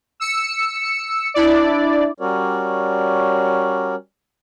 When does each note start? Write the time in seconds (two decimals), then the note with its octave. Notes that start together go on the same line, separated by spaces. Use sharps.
0.20 E6 C#7
1.34 D4 E4 D5
2.20 G3 C#4 F#4 A#4 C#5 D5